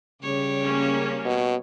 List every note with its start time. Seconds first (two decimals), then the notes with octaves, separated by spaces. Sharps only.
0.23 C#3 G3 G4 C#5
0.64 A#3 C#4
1.25 B2